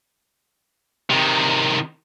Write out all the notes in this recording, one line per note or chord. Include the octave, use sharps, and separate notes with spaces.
C3 D#3